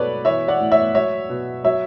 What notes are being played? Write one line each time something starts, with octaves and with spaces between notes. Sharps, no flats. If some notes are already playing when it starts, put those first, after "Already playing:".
Already playing: B2 F#3 A4 B4 C#5 D5
E3 C#5 E5
D5 F#5
A2
C#5 E5
F#3 C#5 E5
B2
F#3 C#5 E5